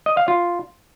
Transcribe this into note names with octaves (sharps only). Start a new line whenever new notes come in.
D#5
F5
F4